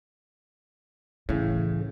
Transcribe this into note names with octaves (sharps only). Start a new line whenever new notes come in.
A2 C#3 E3